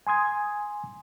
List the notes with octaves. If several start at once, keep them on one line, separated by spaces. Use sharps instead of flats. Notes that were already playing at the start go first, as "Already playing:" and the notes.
G#5 C6 D#6 G#6